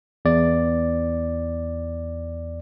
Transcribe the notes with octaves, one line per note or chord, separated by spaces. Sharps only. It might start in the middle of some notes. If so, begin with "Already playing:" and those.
E2 D5